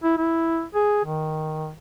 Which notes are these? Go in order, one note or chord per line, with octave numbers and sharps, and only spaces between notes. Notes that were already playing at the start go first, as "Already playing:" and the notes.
E4
E4
G#4
D#3